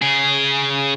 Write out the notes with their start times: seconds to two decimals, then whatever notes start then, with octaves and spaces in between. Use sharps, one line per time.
0.02 C#3 G#4